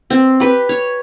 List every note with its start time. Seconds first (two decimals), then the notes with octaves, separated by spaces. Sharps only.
0.10 C4
0.40 G4 B4
0.69 C#5